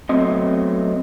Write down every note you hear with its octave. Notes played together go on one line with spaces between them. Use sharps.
F#3 A3 B3 C4 D#5